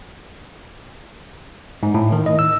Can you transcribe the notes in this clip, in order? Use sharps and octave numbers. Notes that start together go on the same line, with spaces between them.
G#2
A2
D#3
D#5
E6